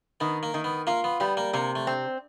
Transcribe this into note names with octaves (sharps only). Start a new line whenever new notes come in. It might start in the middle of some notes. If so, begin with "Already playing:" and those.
D#3 B3
A#3
D#3
B3
A#3 F4
B3
G3 B3
A#3
C3 A#3
A3
C4